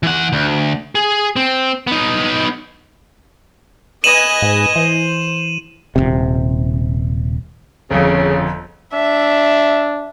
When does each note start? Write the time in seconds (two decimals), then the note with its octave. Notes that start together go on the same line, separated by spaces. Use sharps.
0.03 E3 F#5
0.33 D2
0.95 G#4
1.36 C4
1.87 B3 D#4
4.04 B4 D#5 G#5 D#7 E7 F#7
4.42 G#2
4.76 E3 C5
5.96 D#1 G#1 C3
7.91 G1 F2 C#3
8.93 D4 E5